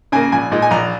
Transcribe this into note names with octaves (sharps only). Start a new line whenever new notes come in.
C#3 A#3 G#5
A#1 G#5
A#2 G#3 D#4
G#5
A#1 A#5